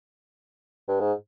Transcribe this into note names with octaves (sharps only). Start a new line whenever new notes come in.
G2
G#2